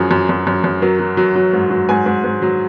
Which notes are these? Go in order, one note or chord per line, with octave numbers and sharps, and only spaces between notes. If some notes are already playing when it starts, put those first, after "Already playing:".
Already playing: F#2 F3 F#3 G#4
F#2
F#2
F#2
F#2
F#3 A#4
F#3
F#3
F#3
G#2
F#3
G#2 G#5
G#2
G#2
F#3